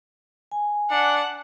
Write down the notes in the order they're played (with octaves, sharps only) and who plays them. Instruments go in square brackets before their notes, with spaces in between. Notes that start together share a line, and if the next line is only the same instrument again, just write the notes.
[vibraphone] G#5
[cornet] D4 [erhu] F#5